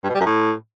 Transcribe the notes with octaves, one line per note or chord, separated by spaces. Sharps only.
G2
B2
G3
F#2
A2